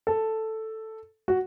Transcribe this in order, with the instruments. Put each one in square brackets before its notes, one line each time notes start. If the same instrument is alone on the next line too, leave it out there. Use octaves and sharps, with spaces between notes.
[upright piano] A4
F#4